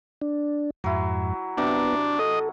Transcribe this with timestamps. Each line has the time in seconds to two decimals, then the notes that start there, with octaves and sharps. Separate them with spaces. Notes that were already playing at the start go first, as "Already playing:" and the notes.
0.22 D4
0.84 F2 G#2 F#3 E4
1.57 C3 F#3 B3 D4 A#5
2.19 A4 D#5